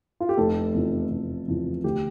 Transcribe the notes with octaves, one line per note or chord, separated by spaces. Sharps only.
F4
G4
F1 A4
E2 C3 F3
F1
E2 C3 F3
D2 G4